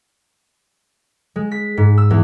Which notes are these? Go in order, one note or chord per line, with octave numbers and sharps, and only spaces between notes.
G#3
B6
G#2
E6
E2